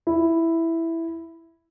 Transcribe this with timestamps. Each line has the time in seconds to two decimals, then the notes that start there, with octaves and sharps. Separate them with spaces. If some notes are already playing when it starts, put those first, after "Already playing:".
0.07 E4